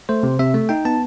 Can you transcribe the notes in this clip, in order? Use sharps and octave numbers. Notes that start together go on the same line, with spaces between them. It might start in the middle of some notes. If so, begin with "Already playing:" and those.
A3 C5
C3
C3 E5
A3
D#4 G5
B3 A5